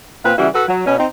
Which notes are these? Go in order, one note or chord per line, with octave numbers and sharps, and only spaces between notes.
A#2 C4 B4 F5
C#3 E3 G3 E4 F#4
F#4 A4 B4
F#3
B2 C#4
C4 D#4